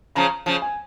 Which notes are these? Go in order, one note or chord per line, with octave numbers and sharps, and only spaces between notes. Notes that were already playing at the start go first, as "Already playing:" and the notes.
C#3 F3 A#5
C#3 F3
G#5